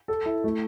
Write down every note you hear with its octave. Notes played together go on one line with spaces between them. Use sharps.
A4
E4
A3